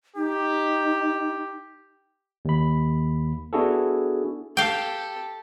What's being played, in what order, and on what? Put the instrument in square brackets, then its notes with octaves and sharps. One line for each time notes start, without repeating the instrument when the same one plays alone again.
[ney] D#4 [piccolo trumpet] G4
[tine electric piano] D#2 B5
B3 D4 E4 F#4 G#4 A4
[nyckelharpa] G4 A4 [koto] F5 G5